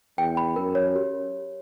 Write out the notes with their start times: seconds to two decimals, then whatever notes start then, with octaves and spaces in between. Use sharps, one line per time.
0.18 E2 G5
0.37 B5
0.56 F#2 A#4
0.75 C#5
0.96 G4